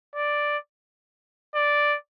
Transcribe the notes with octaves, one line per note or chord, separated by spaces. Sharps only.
D5
D5